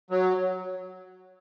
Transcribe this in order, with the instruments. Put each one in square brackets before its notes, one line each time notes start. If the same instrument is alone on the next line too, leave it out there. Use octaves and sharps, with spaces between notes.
[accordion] F#3